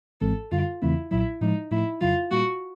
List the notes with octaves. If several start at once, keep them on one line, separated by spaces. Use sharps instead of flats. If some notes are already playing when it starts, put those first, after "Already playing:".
G#1 G#2 E3 G#3 C4 A4
F#2 D3 G3 F4
E2 C#3 E3 A3 C4 E4
B1 A#2 F#3 E4
A2 F3 G#3 D#4
A2 F3 A3 E4
F2 C#3 F#3 F4
A#2 G3 A#3 F#4